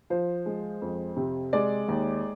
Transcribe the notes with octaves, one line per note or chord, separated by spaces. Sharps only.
F3 C5
G#3
F2
C3
G#3 D5
D#2